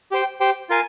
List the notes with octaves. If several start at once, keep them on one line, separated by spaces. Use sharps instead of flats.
G4 C5 G5
G4 C5 G5
F4 A#4 F5 G#5